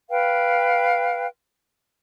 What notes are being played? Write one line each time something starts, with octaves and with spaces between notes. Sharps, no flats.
B4 F5 G5